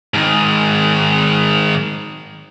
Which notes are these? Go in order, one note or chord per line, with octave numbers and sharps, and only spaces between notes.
G#2 D#3